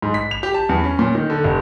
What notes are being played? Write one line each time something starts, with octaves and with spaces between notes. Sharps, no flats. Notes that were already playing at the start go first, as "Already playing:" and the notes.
G#2
B6
F7
G4
A5
E2
C#4
A#2
D#3
D3
F1